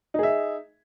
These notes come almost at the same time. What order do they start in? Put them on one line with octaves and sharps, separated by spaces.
D#4 G#4 E5